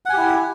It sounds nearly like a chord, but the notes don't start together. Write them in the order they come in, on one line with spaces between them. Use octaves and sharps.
F#5 G#5 G4 E4